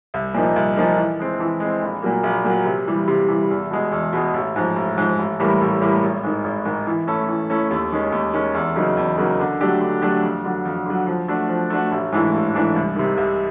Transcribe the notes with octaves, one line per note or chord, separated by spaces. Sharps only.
C2
A#2 F3 A#3 D#4
C2
A#2 F3 A#3 D#4
E3
G#3 C4
E3
G#3 C4
A#1
A#2 F#3 A#3
A#1
A#2 F#3 A#3
C3
E3 G3
C3
E3 G3
E2
B2 G#3
E2
B2 G#3
A1
G#2 F3
A1
G#2 F3
A1
A2 E3 G3 A#3
A1
A2 E3 G3 A#3
G#1
G#2 D#3
G#1
G#2 D#3
E3
A3 C#4 E4 A4
E3
A3 C#4 E4 A4
D#2
D#3 G#3 C#4
D#2
D#3 G#3 C#4
E2
C#3 F#3 A#3 D#4
E2
C#3 F#3 A#3 D#4
D3
F#3 A3 D4 G4
D3
F#3 A3 D4 G4
F2
D3 F#3
F2
D3 F#3
F3
A3 D4 F#4
F3
A3 D4 F#4
A1
G#2 E3 A3 D4
A1
G#2 E3 A3 D4
C2
C3 D#3
C2